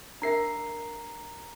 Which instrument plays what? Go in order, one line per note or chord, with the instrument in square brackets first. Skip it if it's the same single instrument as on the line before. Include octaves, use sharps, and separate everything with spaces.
[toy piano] D4 A#4 E5 [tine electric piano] A#5 C7